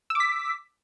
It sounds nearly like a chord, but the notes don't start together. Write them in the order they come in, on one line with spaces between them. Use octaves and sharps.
E6 D6 B6